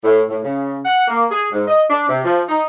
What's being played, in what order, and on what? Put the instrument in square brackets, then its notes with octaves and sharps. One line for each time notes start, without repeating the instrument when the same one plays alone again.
[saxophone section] A2
A2
C#3
F#5
A#3
G#4
G#2
D#5
D4
C3
F3
D#4